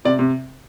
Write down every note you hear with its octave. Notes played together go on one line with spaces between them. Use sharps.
C3 D5
C3